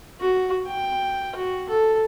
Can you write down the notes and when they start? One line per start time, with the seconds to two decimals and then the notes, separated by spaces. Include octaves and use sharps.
0.21 F#4
0.68 G5
1.36 F#4
1.69 A4